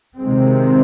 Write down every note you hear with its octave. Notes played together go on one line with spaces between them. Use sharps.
C3 D#3 G#3 C4